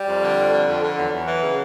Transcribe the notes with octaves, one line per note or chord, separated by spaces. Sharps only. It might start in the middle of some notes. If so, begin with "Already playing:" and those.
Already playing: G3
F2
D3
F2
D3
F2
D3
E2 F#3
E2
E3
C#3